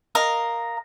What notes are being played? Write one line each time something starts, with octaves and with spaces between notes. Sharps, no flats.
A#4 D#5 F5